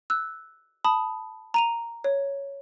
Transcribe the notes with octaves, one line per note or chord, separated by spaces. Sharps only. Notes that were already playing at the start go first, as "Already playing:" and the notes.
E6 F#6
A5 B5 D#6
A#5 D#7 F7
C#5